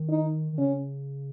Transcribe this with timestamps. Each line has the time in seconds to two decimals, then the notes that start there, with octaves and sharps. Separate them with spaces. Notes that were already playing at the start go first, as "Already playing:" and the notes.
Already playing: D#3
0.09 D#4
0.53 D#3
0.58 C#3 C#4